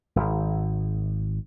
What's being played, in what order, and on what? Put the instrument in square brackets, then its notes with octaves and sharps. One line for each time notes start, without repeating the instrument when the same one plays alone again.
[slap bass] D#1 G#1